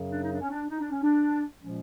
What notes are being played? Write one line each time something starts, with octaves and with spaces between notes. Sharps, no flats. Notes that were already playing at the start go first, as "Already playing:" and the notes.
Already playing: F#2 C#3 F#3
D4
D#4
D4
C#4
D4
D#4
D4
C#4
D4
A#2 F3 G#3 C#4